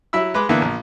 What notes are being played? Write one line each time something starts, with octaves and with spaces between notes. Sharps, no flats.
F#3 E4 E5 B5 E6
G#3 B4 B5 D6
D3 E3 A#3 B3 E5
A#1